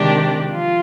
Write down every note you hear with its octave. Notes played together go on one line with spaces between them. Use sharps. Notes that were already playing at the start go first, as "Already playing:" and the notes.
Already playing: C3 D#3 G#3 D4 G4
F3 F4